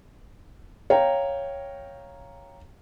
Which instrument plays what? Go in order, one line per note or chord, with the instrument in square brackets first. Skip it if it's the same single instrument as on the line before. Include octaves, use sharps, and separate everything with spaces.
[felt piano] C#5 F5 G5 A#5